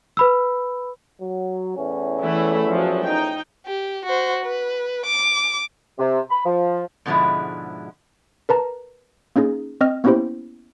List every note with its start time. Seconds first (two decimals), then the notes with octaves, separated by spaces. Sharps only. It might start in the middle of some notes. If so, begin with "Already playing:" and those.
0.17 B4 B5 E6
1.21 F#3
1.76 E2 A2 C#4
2.23 E3 A3 E4
2.70 F3 F#3
3.05 D#4 G5
3.67 G4
4.06 F#4 C5
4.45 B4
5.06 D6
5.99 C3
6.29 B5
6.45 F3
7.06 G#2 B2 D3 F3 G#3 E4
8.49 A#4 B4 A5 A#5
9.36 A#3 C#4 D#4 G#4
9.81 C4 D#5 F6
10.04 A#3 B3 C#4 E4 G4 C5